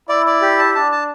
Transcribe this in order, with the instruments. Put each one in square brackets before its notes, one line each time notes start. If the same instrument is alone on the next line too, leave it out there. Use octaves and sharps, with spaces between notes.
[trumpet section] E4 [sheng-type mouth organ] D5
[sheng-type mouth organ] D5
G4
A5
[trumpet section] D4 [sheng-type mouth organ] A5
[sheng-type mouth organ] A5